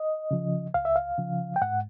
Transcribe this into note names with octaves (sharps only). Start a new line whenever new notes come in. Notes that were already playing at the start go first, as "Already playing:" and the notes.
Already playing: D#5
C#3 F3
C#2 F5
E5
F5
C#3 F3
G5
G#2 F#5